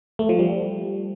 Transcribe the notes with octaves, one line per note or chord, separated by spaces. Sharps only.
A3
F3
G3